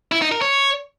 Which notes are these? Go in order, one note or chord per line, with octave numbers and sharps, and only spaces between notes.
E4
D#4
A#4
C#5